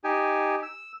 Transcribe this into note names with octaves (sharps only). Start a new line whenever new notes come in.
D#4 G4 G#5
E6